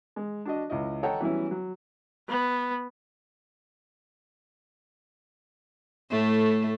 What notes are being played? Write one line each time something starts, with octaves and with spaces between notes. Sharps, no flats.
G#3
D4 F#4 D#5
C#2 E4 D#5
A4 C#5 D#5 F#5 G5 A#5
E3 F#3 G3 B3 C#4 E4
F#3
B3
A2 A3